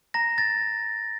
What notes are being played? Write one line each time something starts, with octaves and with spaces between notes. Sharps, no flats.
A#5 A#6
A6